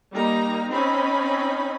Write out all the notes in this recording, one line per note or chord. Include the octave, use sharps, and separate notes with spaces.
G3 A#3 D#4 A#5
C4 C#4 D#4 B5